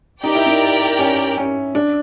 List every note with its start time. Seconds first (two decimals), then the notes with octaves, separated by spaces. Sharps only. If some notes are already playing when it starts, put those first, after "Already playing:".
0.23 D#4 G4 A#4 D5 G5
0.35 E4
0.47 D#4
0.99 C#4
1.37 C#4
1.75 D4